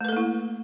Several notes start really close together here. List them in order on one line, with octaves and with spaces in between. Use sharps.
A3 B4 A4 A#3 E4